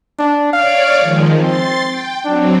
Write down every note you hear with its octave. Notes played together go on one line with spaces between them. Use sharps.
D4
C#5 D5 F5 D6
D#3 F3 G#3
C4 C6 A6
G5
F#3 C4 D4